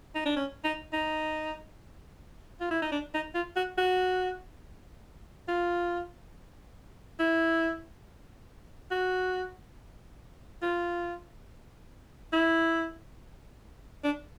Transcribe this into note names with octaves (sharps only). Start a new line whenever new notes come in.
D#4
D4
C#4
D#4
D#4
F4
E4
D#4
D4
D#4
F4
F#4
F#4
F4
E4
F#4
F4
E4
D4